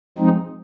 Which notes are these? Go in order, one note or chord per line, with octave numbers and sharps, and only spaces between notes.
F3 G#3 C4 D#4